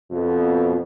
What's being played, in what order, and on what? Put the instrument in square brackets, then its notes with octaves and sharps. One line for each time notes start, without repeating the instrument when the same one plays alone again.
[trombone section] F2 B2